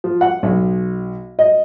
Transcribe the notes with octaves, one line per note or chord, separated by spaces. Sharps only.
F3
F#5
B1
D#5